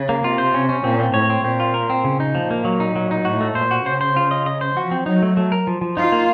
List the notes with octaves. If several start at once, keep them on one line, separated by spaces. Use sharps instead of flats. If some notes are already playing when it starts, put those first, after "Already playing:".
Already playing: C#3
A#3
C3 F4
C5
C#4
C#4
A#2 C4
C4
A2 C#5
C4
A#2 C4
F4
A#4
C4
C#3
D#4
A#2 F3
A#3
F#3
D#4
F#3
D#4
A2 F#4
A3
A#2 C5
F#4
C#3 C5
C5
F4
D#5
D#5
C5
F3 F#4
C4
F#3 D#4
A3
A3
A#4
F3
F3
D#4 F4
A#3